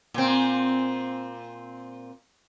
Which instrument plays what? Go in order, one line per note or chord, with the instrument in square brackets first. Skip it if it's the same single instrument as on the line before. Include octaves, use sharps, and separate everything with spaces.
[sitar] A#2 C4